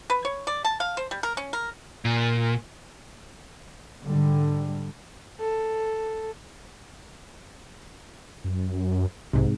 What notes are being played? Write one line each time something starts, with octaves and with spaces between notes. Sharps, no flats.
B4
C#5
D5
A5
F5
C5
G3
A#4
C#4
A#4
A#2
G#2 D3 G3
A4
F#2
B1 G#2 C3